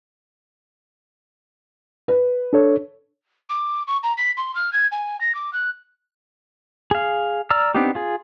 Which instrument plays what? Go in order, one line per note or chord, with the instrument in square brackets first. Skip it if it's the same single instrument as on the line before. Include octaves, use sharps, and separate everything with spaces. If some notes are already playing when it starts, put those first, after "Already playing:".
[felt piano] B4
[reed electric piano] D4 A4 C#5
[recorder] D6
C#6
A#5
B6
C6
F6
G#6
G#5
A#6
D6
F#6
[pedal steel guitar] G#4 F5
D5 A#5 E6 F6
B3 C4 D4 D#4 G4
F4 G#4